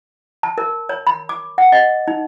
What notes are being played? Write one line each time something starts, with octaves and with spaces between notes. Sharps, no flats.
A5
A#4
C#5
B5
D6
F#5
D#5
D#4